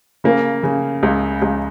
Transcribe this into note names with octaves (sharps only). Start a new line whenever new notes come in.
C#3 A#3
C#3
C#2
C#2